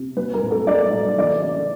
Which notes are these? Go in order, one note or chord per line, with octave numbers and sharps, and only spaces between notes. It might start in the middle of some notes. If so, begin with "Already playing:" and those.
Already playing: C3
F#3 B4
A#4
A2
A4
F#3 D5
A2
E3 D5
C#3